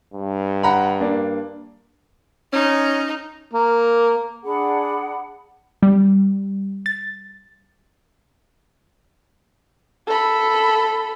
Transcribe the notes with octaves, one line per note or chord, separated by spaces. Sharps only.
G2
F#5 A#5 B5
A#3 D4
C#4 D#4
A#3
D4 G#4 F#5 B5
G3
A6
A4 B5